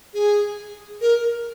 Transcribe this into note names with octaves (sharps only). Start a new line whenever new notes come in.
G#4
A#4